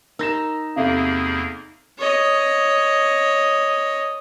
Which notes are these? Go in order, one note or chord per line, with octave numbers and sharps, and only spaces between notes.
D#4 A#4 E6 A#6 E7
E2 C3 A#3 G#4 A4 E5 F5
C#5 D#5